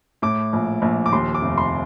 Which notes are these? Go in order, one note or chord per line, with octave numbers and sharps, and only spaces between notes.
A2 D6
A#1
A#1
D6
D#2 C6
D6
F1
C6